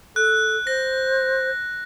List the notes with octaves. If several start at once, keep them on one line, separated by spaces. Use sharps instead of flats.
A4 F#6
C5 A#6